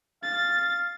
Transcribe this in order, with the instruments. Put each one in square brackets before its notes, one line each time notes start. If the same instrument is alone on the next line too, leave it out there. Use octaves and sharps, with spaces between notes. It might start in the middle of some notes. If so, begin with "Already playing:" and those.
[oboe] F5 [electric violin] A6